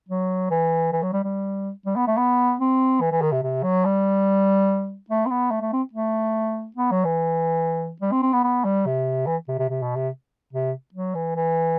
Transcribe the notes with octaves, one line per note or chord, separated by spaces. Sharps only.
F#3
E3
E3
F#3
G3
G3
G3
B3
A3
B3
C4
E3
E3
D#3
C3
C3
F#3
G3
A3
C4
B3
A3
A3
C4
A3
B3
F#3
E3
G3
C4
C4
B3
B3
G3
C3
E3
C3
C3
C3
B2
C3
C3
F#3
E3
E3